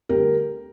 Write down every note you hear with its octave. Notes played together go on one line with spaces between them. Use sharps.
D2 D3 G3 G4 A#4